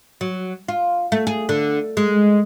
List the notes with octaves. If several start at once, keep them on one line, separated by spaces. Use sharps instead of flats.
F#3
F4
A3
G#4
D3
G#3